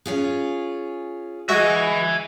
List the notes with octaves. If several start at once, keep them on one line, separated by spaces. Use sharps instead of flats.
C#4 F4 G#4
G#3 F#4 E5 G#5